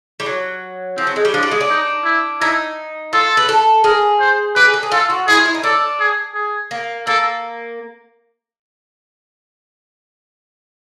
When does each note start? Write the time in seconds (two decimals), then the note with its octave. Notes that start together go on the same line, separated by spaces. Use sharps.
0.20 G3
0.26 F#3
0.98 F3 C4
1.07 F#3
1.16 G#3
1.25 G3
1.34 F3 D4
1.43 G3
1.51 G#3
1.61 D4
1.70 D#4
2.05 E4
2.41 D#4 E4
3.13 F4 A4
3.37 B4
3.49 A4
3.84 G#4 A#4
4.20 C5
4.56 G4 B4
4.65 G#4
4.74 A4
4.83 G#4
4.92 F4 A4
5.10 F#4
5.27 E4 G#4
5.37 F4
5.46 E4
5.55 D#4
5.63 D4 A4
6.00 G#4
6.35 G#4
6.71 A#3
7.07 A#3 A4